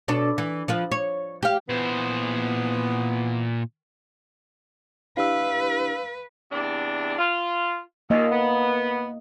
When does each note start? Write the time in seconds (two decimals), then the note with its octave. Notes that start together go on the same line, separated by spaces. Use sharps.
0.08 B2 D4 A4
0.38 E3
0.68 F3 F4 B4
0.91 C#5
1.43 G4 F5
1.69 A#2 E3 B3 C5
5.17 D4 E4 G4 B4 F5 E6
6.52 E2 C3 D4
7.18 F4
8.10 D#2 A#2 A#3 D#5
8.31 B3